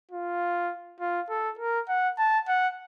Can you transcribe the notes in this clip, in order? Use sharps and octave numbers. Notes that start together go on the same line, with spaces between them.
F4
F4
A4
A#4
F#5
A5
F#5